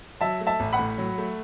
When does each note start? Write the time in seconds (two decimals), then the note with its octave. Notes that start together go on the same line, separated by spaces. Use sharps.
0.21 F#3 E5 A5
0.41 A3
0.47 E5 A5
0.60 A1
0.73 F#5 B5
0.79 A2
0.98 F#3
1.18 A3